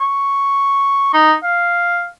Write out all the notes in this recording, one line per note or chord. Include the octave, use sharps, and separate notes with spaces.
C#6
D#4
F5